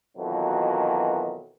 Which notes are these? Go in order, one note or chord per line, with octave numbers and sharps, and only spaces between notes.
F2 B2 D#3 E3 F#3